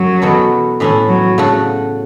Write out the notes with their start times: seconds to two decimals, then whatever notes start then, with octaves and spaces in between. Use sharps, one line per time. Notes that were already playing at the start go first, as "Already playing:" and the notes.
Already playing: F#2 F#3
0.22 E2 B2 B3 A4
0.80 A2 E3 C#4 E4 A4
1.08 F#3
1.38 C#3 A3 F#4 A4